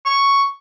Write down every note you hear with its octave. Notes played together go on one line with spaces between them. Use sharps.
C#6